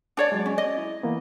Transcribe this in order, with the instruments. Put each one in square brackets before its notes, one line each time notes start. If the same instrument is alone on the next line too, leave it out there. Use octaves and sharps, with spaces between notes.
[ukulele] D4 C#5 D5
[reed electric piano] F#3 G#3
[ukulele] C#4
[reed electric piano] D5 [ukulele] D#5
[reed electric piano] E4
E3 A#3 B3